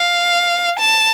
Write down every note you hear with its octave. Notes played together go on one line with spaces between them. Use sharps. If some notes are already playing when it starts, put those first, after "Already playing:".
Already playing: F5
A5